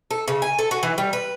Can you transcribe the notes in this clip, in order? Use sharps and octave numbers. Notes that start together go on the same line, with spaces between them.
A4
C#3
G#5
A4
F#4
E3
G3
B4